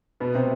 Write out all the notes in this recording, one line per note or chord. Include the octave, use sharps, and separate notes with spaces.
B2 B3
C3 C4